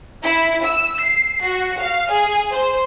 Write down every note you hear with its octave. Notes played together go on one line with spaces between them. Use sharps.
E4
E6
C7
F#4
F5
G#4
C5